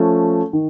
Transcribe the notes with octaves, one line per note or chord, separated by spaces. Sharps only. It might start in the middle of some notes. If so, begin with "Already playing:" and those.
Already playing: F3 A3 C#4
D#3